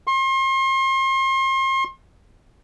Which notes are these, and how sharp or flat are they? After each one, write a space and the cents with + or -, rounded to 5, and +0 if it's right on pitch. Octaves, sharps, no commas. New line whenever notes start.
C6 +40